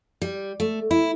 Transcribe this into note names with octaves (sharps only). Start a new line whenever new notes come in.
G3
A3
E4